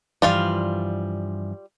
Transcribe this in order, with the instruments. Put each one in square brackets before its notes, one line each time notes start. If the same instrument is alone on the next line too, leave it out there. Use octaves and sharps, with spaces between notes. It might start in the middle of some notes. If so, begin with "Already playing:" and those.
[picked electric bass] G2 E3 F3 [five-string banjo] G3 F4 F5